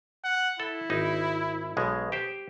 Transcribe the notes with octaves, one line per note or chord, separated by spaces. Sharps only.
F#5
E4 A4
G#1 D#4
B1 B2 G#3
G4 C5